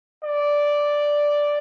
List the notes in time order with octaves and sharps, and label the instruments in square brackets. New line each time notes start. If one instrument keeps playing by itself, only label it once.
[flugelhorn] D5